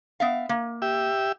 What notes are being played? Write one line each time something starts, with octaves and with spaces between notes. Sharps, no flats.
B3 E5 F5
A#3
G4 E5